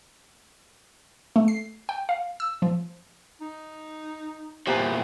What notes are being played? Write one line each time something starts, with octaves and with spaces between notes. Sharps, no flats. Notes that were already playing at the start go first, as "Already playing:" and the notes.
A3
C7
G5
F5
E6
F3
D#4
E2 A#2 G4 B4 C5 G5 G#5 A#5